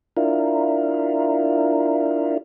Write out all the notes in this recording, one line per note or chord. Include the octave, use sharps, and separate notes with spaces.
D4 E4 F4 A#4